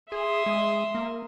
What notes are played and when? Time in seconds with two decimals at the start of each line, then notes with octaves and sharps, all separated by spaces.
0.12 G#4 E5 C6 D#6
0.46 G#3
0.95 A#3